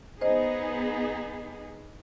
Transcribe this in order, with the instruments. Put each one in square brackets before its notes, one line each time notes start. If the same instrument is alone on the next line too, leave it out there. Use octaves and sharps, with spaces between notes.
[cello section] B3 D#4 G#4 [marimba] C5 D#5